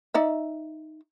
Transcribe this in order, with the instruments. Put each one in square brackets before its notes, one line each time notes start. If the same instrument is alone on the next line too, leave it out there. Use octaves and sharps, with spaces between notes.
[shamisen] D#4 D5 E5